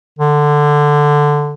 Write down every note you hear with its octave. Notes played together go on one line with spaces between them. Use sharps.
D3